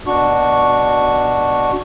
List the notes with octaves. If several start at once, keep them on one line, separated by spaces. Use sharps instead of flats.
B2 D4 F#4 C#6